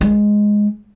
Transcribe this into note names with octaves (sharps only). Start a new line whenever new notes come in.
G#3